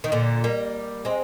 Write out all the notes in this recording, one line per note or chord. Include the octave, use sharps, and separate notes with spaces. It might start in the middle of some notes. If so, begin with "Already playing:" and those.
D#3
A#2 D3
G3 A#3
G#3 C4